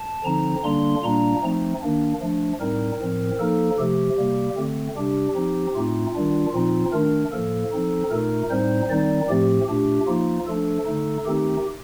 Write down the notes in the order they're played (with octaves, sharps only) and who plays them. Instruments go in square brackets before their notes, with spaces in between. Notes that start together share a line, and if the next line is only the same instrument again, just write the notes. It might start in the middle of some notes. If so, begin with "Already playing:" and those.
Already playing: [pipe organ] A5
D3 F3 C4 D#4 A#5
D3 G3 A#3 D4 C6
A#2 G3 A#3 D4 A#5
F3 A3 C4 D#4
D#3 A#3 D4
F3 A3 D4
A2 G3 C4 D#4 A#4
A2 F3 C4
F3 A#3 D#4 A4
C3 F3 A3 G4
C3 G3 A#3
D3 A3 C4
C3 G3 D4 G4
F3 C4 D#4
A2 A3 C4 D#4 F4
D#3 G3 D4
A#2 F3 C4 D#4 F4
D#3 A3 D4 A#4
A2 F3 A#3 A4
F3 C4 D#4
A#2 A3 D#4 A#4
A2 G3 C4 D#4 C5
D#3 G3 C4 D#4 D5
A2 F3 A3 C4 G4
A#2 A3 D4 G4
F3 A#3 D#4 F4
F3 A3 D4 A4
D3 A3 D#4
D#3 A3 C4 D#4 G4